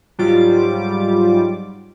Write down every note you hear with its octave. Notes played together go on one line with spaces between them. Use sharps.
G#2 F#3 G3 F4 D6